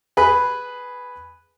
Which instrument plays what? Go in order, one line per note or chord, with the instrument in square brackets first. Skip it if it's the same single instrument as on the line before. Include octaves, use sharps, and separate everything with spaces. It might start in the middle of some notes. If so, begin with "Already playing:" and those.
[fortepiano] G#4 B4 B5